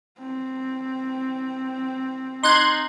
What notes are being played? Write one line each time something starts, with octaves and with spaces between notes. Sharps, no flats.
C4
D#4 C6 F#6 G#6